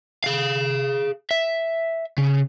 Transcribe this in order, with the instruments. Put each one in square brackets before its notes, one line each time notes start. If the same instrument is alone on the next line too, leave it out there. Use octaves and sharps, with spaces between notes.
[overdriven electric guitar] G#4 F5
E5
C#3